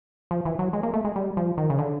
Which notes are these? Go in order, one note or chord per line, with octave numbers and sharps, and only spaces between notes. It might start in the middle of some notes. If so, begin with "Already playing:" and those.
F3
E3
F#3
G#3
A#3
A3
G#3
G3
F3
D#3
C#3
D3